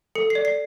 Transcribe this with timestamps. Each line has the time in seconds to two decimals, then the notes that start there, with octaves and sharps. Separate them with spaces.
0.15 A4 C#7
0.30 C7
0.35 D5
0.45 C7